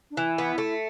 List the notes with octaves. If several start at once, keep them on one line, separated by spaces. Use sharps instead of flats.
D4
E3 E4
B3
A3